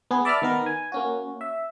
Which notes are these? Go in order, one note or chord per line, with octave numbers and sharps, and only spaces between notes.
B3 G#4
D5 E5 A5 B5 D6 F6
D#3 B3 A#4
G#5
A#3 C#4 F#4
E5